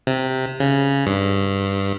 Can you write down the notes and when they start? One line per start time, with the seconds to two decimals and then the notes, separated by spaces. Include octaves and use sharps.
0.07 C3
0.60 C#3
1.06 G2